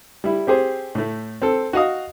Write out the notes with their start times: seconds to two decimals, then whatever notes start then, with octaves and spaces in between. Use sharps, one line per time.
0.24 G3 E4
0.47 C4 G4 G#4 C5
0.95 A2 A3
1.42 C4 A4
1.73 F#4 D#5 F5 D#6